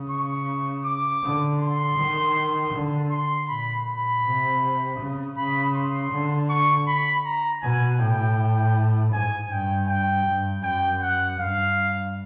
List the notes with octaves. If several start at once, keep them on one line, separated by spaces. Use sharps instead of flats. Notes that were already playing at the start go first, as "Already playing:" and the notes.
Already playing: C#3
C#6
D6
D3
C6
D#3
D3
C6
A#2 B5
B5
C3
C#3
C#3 B5
C6
D3
C#6
B5
A#5
B2 G#5
A2 G5
G#2 G#5
G2 G5
G5
G2
F#2 G5
F#5
G2 F5